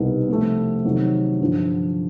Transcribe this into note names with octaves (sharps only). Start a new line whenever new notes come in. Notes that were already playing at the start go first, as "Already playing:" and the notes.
Already playing: C2 B2 G3 B3 D#4
C3 F3 A3
C3 D#3 F#3
G2 D3 F3